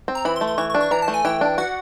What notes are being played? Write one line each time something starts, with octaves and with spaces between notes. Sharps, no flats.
C4
A#5
E3 B5
C6
A3
C6
E3 C#6
C#6
D4
C#6
E3 A#5
A5
A3
G#5
E3 G5
D4
F#4 F#5